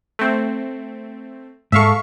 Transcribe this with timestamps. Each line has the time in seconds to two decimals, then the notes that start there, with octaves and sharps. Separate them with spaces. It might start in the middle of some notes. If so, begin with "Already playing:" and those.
0.19 A3 C4
1.72 G#2 A4 E5 F5 C#6